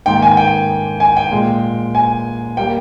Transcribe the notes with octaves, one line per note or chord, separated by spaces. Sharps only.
G#2 D#3 A#3 G5
G#5
G5
G#5
G5
A#2 G#3
G#5
G3 A#3 G5